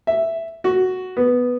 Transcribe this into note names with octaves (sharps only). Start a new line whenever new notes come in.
E5
F#4
B3